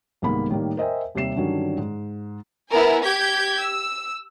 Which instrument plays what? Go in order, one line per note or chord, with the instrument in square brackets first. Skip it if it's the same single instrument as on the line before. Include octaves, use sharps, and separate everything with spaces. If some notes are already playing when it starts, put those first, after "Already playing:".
[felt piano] C2 G#2 D#3 A#3 B3 B5
A2 D#3 G3 A#3
A#4 C5 D#5 E5 G5 G#5
D#2 C3 G3 E5 C7 E7
G2 D3 D#3 F#3 C#4
G#2
[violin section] B3 E4 A#4 G#5
G4 G6 G#6 B6
E6